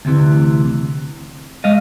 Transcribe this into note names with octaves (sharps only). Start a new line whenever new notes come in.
D2 C3 E3
G#3 D#5 F5